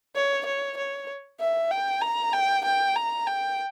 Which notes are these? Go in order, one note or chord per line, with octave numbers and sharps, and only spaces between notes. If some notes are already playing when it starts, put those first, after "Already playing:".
C#5
C#5
C#5
E5
G5
A#5
G5
G5
A#5
G5